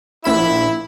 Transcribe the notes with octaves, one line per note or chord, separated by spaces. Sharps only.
A#1 E4 B5 E7